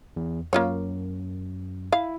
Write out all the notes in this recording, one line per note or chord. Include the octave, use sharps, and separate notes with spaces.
E2
F#2 A#3 F4 C#5
E4 F5